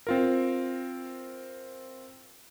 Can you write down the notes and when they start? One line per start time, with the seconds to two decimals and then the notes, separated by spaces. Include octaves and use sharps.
0.07 C4 F4 A#4